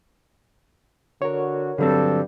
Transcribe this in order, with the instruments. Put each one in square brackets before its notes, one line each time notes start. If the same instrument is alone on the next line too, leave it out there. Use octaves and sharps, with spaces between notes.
[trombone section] D3 F#4 [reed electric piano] A#4 C#5
[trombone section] G2 G3 [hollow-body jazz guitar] D3 F#3 C4 [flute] A4